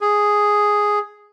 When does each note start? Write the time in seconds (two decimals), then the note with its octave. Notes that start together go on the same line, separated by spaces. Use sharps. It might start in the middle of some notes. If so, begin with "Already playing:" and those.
0.01 G#4